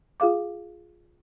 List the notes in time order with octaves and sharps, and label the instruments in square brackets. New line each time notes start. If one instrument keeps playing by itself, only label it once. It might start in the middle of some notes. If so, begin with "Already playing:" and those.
[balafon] F4 G#4 F5 D6